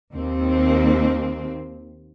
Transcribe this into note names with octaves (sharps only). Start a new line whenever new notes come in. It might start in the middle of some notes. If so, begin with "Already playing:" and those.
D#2 C4